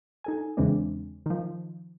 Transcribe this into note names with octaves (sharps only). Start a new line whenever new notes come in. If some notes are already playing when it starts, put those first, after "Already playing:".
D#4 A4 G#5
E2 C#3 E3 G#3 C4 D4
D#3 F3